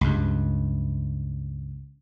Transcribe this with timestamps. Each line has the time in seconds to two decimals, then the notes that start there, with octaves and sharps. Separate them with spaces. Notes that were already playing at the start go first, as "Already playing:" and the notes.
0.01 C#2 G2